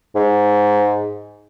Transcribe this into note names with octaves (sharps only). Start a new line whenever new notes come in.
G#2